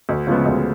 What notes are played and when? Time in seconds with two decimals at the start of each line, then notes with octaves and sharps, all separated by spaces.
0.09 D2
0.27 C#3 F3 G#3 B3
0.45 D2